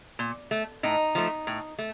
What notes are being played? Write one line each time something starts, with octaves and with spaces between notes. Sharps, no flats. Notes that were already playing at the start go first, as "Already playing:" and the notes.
A#2
A3
A2 D#4
F3 A3
A2
A3